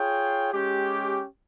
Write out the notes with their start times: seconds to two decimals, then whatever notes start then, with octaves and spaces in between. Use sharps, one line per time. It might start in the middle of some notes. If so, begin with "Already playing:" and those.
Already playing: F4 G#4 C#5 G5
0.53 G#3 C#4 G4